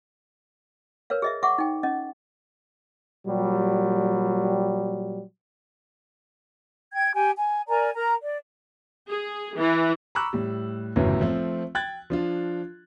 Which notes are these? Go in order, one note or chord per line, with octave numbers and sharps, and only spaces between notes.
A#4 B4 C#5 F5
G#4 D#5 E5
E5 F#5 C#6 D6
D#4 G5
C#4 D#5
A#2 F#3 G3
G5 G#6
G4 G5 G#5
G#5
A#4 D5 G#5 A#5
A#4 A#5
D5
G#4
E3
A#5 B5 C#6 D6 E6 F#6
A2 G3
G1 F#2 A2 C#3 E3
F3 A3 C4
G5 F#6 G#6 A6
F3 D4 F4